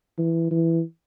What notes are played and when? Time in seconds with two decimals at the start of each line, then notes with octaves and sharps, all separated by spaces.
0.18 E3
0.51 E3